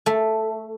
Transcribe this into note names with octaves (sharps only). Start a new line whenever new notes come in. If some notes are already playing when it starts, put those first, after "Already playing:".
A3